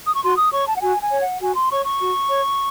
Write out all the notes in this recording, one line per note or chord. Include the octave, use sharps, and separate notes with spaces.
D#6
C#6
F#4 C6
D#6
C#5 C#6
A5
F#5
F#4 G#5
G#5
C#5
F#5
F#4 G#5
C6
C#5 C#6
C#6
F#4
C#5